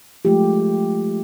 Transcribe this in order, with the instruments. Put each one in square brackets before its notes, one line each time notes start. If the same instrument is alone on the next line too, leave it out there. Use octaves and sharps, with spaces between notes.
[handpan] F3 G#3 A3 F4 G4